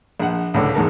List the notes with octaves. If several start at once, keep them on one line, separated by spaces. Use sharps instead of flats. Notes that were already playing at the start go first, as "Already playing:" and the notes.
A#1 F#5
C#2 A2 D3
E2 G#2 A#4 A5